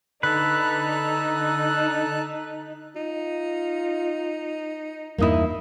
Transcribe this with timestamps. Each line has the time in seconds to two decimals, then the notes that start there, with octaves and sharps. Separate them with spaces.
0.23 D3 D#4 A4 B4 F#6
2.96 D#4 F4
5.18 E2 G2 A#3 D#4 E4 D#6